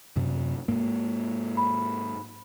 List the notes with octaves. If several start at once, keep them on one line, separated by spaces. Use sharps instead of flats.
F#2 C3
G#2 A#3
B5